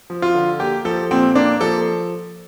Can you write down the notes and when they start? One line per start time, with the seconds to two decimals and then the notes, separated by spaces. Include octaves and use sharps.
0.10 F3
0.22 F4
0.35 D3
0.60 A#3 G4
0.85 F3 A4
1.11 A#2 C4
1.35 A#3 D4
1.61 F3 A4